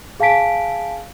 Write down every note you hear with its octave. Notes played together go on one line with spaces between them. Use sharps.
G#4 F5 G#5 A5 B6 D7